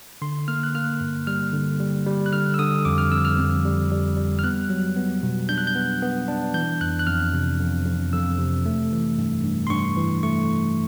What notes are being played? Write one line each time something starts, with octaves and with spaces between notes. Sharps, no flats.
D3 C6
A#3 F6
F#6
A#3 F6
G2
G3 F6
D3
G3
G3
F#6
D3 F6
E6
D3 D#6
F2 D6
F6
F2 E6
F6
F2
G3
G3
G3
F6
B3 F#6
F#3
B3
B2
D4 G6
F#6
G6
B3
B3
D4
E3 G6
F2 F#6
F#6
F2 F6
C3
F2
F2
F2 E6
C3
A3
E3
G2
G2
C6
G2 C#6
E3
A3 C#6